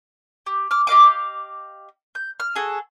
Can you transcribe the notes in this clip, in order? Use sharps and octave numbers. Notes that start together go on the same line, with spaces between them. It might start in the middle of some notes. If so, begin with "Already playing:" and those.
G4
D6 F6
G4 D#5 F5 D6
G6
F6
F#4 G#4 A4